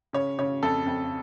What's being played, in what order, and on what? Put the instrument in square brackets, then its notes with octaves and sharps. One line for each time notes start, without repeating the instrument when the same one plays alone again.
[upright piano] C#3 C#5
C#3 C#5
F2 A4
F2